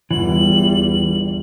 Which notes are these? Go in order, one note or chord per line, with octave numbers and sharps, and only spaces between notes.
G1 E2 E3 G3 F#7